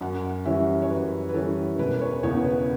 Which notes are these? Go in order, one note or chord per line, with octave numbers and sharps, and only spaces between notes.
F#2 F#5
E3 G3 C#4 E5
C#5
F#2 B4
B4
E3 G3 C#4 A4
E1 B4
C#5
E2 C#3 E3 B3 C#5
B4